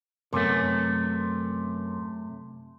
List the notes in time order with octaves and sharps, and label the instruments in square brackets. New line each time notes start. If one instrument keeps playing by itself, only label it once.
[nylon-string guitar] F#2 B3 [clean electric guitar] C3 A3